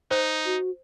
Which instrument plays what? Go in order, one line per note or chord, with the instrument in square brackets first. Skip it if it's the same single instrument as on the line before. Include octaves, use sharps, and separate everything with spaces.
[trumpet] D#4 [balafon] C5
[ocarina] F#4